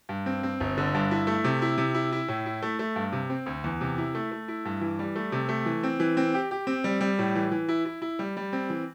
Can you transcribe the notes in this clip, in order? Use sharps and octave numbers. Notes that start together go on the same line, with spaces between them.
G2
C4
C4
G1
D3
G2
E4
A3
C3
E4
C3
E4
E4
A2
E4
A3
A3
G2
C3
C4
D2
E2
C3
E4
A3
A3
E4
G2
E3
G3
A3
C3
A3
E3
C4
E3
C4
G4
G4
C4
G3
G3
A2
E3
E3
E4
E4
E4
G3
G3
C4
E3